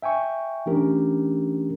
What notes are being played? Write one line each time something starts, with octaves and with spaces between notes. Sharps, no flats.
E5 G5 G#5 C#6
E3 A3 C#4 D4 G4 A#4